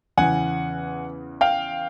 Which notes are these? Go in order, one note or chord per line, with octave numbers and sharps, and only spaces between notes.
E2 C#3 E3 F#5 G#5
F5 G5